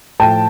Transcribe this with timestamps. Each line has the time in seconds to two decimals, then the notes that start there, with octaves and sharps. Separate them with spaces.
0.20 A2 F3 G5 A5